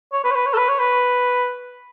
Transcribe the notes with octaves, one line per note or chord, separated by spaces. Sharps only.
C#5
B4
C#5
B4
C#5
A4
B4
C#5
B4